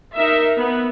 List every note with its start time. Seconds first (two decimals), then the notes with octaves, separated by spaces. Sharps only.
0.16 D#4 A#4 E5
0.57 B3